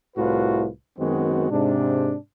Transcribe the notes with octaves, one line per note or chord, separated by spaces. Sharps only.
C2 A2 F4 F#4 B4
F#2 D#3 G#3 B3 C4 F#4
G#2 C3 D4